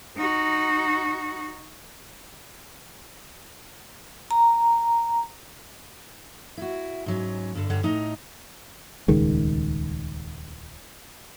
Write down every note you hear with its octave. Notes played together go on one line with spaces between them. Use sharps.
D#4 F#4
A#5
E4 F#4
G#2 F#3 C#4
G2 D3
G2 D3 G3 C#5 F#5
A2 D#4 D#5 A#5
D#1 C#2 D#3 G#3